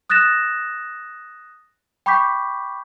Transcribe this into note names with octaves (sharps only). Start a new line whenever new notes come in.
D#6 F#6 A6 A#6 E7
G5 B5 C#6 D6 G6 B6